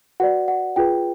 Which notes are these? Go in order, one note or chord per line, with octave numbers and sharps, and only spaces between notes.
F#4 B4 D5 F#5
F#5
F4 G#4 B4 G5